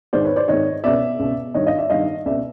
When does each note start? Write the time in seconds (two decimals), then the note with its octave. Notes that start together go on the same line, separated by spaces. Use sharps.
0.13 G#2 D#3 C5 D5
0.24 B4 C#5
0.36 C5 D5
0.48 G#2 D#3 C#5 D#5
0.84 C#2 B2 D5 E5
1.19 C#2 B2
1.54 G2 D#3 C#5 D#5
1.66 D#5 F5
1.78 D5 E5
1.90 G2 D#3 D#5 F5
2.26 C#2 B2 D5 E5